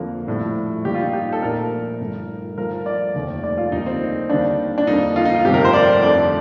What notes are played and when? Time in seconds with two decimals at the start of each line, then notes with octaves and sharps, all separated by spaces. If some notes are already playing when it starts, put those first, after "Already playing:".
Already playing: F2 D3 F3 A#3
0.27 A#1 A2 G3
0.85 G2 D#3 G3 A#3 G4
0.94 F4
1.03 D#4
1.13 G4
1.33 A4
1.42 A#1 A#2 F3 A3 A#4
1.99 G1 G2 D#3 A3
2.58 G2 F3 A3 A#4
2.86 D5
3.14 F1 D#2 D#3 A3
3.44 D5
3.57 F4
3.72 D#2 D3 G3 A#3 D#4
3.86 C4
4.30 D#2 D#3 G3 A#3 D4
4.78 D4
4.87 F2 D3 G3 A#3 D#4
5.16 F4
5.25 D#4
5.34 F4
5.44 G1 F2 C3 D#3 A3 G4
5.54 A#4
5.65 C5
5.73 D5
6.02 F2 D3 A3 D5